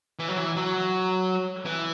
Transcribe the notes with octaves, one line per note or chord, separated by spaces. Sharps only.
E3
F#3
E3
F#3
E3